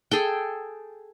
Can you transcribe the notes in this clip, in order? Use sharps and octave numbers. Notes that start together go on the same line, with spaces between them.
G#4 A4 G5